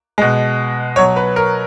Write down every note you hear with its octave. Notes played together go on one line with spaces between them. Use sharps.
B2 G#3
B2 F#3 C#5
B4
A#4